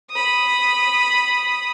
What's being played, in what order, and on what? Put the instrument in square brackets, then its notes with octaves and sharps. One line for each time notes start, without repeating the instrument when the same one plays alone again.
[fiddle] B5 D#6